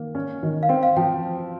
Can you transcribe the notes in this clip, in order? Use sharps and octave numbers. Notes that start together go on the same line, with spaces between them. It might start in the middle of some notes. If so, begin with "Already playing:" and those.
Already playing: D#3 A#3
C#4
D#3
F5
C4 G5
F5
F3 G5